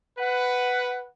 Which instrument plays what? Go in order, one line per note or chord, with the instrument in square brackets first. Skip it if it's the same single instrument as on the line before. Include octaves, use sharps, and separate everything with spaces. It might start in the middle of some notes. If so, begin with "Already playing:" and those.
[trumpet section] B4 F#5